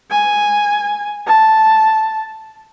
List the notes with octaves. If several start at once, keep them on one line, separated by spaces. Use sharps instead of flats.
G#5
A5